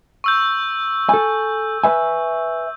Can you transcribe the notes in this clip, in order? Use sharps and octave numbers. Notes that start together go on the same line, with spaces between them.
C#6 E6 G6
A4 G#5
B4 E5 G#5